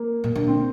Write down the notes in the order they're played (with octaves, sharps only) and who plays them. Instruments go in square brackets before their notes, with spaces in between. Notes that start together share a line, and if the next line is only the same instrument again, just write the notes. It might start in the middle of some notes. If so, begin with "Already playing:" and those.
Already playing: [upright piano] A#3
[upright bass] A#2
D3
[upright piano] C4